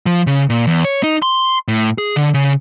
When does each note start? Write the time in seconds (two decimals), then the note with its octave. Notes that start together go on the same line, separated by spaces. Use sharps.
0.06 F3
0.27 C#3
0.50 A#2
0.67 E2
0.85 C#5
1.03 D#4
1.22 C6
1.68 A2
1.98 G#4
2.16 D3
2.34 C#3